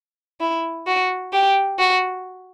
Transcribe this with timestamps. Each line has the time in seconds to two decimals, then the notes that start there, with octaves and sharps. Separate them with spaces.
0.41 E4
0.87 F#4
1.33 G4
1.79 F#4